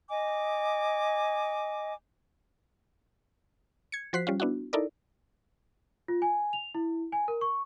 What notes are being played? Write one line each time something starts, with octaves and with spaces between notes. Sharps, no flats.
D#5 G#5 D6
G#6 C#7
F3 F#4 C5 F#6 B6 C7
G3 C#4 F4
B3 D4 E4 F#4
D#4 E4 A4 A#4 D5
F4
G#5
F7
E4
G#5
A#4
C#6